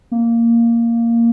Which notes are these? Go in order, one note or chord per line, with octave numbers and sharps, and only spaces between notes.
A#3